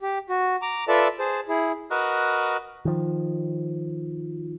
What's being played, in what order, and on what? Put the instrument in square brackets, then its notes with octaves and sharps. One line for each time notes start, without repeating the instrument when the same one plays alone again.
[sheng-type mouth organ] G4
F#4
A#5 D6
F4 A4 B4 D5 E5 A5
G#4 C5 A5
E4 G#4
[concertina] F#4 A#4 B4 D#5
[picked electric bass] D#3 F3